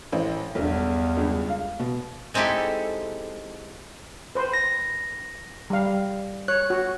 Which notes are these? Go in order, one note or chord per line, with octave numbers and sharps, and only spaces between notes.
A1 C5
B1 E2 G2
C#2 G2
F5
B2
G#3 C4 D#4 E4 G4 A4
B4 C5
A#6
G3 F5
C#5 F#6
F#4